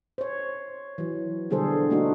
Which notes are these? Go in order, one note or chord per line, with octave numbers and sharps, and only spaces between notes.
C5 C#5
E3 F#3
B2 D3 G3 G#4 A4 C5
A3 A#3 D4 D#4 F#4